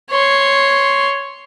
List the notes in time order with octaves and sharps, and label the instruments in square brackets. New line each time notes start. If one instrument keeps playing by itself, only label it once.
[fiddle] C#5 C6